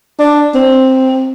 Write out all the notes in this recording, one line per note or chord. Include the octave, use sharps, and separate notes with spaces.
D4
C4